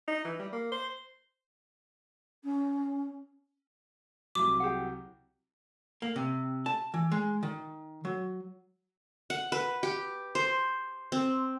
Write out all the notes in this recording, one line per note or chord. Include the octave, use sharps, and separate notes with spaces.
D#4
E3
G3
A#3
C5
C#4
C2 F#3 D6
G4 G#4 F#5
A#3
C3
A5
E3
G#3
D#3
F#3
F#5
B4
G4
C5
C4